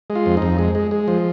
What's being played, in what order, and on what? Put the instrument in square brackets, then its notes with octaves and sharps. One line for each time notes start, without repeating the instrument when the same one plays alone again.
[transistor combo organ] G#3
F4
F2
D#4
F2
G#3
G#3
G#3
F3